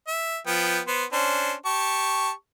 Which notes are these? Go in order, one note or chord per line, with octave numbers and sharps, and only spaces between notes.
E5
F3 B3 G5
B3 C5
C#4 D4 C5
G4 A5 C#6